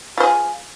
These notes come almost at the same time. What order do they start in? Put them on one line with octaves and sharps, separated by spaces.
F4 C5 G#4